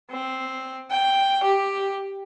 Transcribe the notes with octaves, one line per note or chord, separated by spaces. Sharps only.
C4
G5
G4